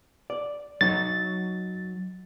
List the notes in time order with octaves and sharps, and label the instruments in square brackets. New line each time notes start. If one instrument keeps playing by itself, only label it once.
[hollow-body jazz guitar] D5
[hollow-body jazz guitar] F#3 D#4 [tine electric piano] A6